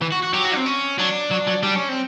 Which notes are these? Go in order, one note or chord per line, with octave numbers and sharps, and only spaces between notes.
E3
F#4
F#4
F#3 G4
F#4
C4
C#4
F#3 D4
F#3
F#3
G3 D4
C#4
C4